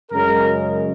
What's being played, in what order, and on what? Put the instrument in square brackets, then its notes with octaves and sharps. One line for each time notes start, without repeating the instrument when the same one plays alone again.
[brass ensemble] F#2 C#3 G#3 C#4 A#4